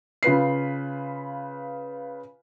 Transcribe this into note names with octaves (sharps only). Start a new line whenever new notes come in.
C#3 F4 B4 C7